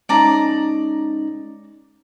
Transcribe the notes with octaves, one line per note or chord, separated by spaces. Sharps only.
G#3 C#4 D#4 D5 A5 A#5